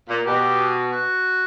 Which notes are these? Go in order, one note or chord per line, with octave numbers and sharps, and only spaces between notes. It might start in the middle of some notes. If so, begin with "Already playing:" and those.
A#2
B2 G4
F#4